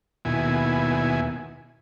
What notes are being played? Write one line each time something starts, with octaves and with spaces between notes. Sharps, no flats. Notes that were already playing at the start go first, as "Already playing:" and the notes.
D#2 B2 E4 G#5